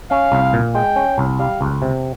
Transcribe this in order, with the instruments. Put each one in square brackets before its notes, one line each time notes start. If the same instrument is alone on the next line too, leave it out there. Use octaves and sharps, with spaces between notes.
[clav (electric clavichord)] C#4 [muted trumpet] F5
[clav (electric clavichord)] C2
A#2
[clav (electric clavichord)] G#3 [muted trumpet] G5
[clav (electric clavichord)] C#4
C2
[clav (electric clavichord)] G3 [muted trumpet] F5
[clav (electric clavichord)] C#2
C3